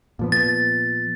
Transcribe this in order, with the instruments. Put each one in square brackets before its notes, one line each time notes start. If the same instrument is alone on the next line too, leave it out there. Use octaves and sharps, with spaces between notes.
[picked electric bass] A#2 F3 B3
[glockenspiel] A6